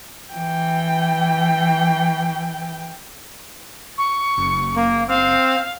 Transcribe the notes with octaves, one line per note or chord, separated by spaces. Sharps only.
E3 G5
C#6
F#1
A#3
C4 F5